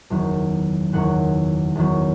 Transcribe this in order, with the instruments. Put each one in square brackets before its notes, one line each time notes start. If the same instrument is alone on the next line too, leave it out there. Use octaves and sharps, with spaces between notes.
[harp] F#1 E2 D#3 F#3 B3
F#1 E2 D#3 F#3 B3 F#5
F#1 E2 D#3 F#3 B3